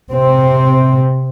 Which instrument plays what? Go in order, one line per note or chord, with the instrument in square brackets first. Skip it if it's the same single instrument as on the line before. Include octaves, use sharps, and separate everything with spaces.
[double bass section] C3 C4